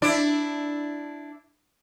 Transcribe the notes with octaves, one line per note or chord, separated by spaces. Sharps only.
D4 E4 D5